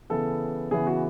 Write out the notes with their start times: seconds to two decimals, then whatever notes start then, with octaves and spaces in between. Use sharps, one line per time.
0.10 C#3 E3 B3 A4
0.71 C#3 E3 B3 G#4
0.87 F#4